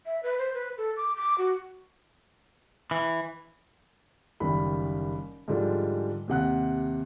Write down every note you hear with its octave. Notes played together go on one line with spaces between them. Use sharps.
E5
B4
C5
B4
A4
D6
D6
F#4
E3
F#1 D#3 G3 B5
G#2 D3 F3 G3 G#3
D#2 C3 F#5 F#6